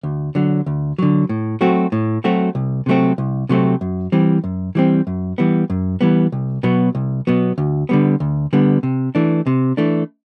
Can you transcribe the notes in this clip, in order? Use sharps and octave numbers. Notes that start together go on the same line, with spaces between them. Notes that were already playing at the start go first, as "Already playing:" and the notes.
D2
D3 F#3
D2
D3 F#3
A2
F#3 A3 C4 F#4
A2
F#3 A3 C4 F#4
C2
C3 F#3 A3 C4
C2
C3 F#3 A3 C4
F#2
E3 G3 C4
F#2
E3 G3 C4
F#2
E3 G3 B3
F#2
E3 G3 B3
C2
B2 F#3 B3
C2
B2 F#3 B3
D2
D3 G3 B3
D2
D3 G3 B3
C3
E3 A3 D4
C3
E3 A3 D4